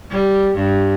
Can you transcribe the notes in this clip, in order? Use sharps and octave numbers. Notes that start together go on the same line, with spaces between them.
G3
G2